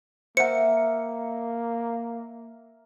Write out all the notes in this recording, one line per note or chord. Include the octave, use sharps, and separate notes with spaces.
A#3 A#4 C5 E5 F#5 C#7